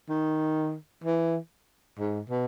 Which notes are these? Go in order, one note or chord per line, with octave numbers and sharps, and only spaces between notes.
D#3
E3
G#2
B2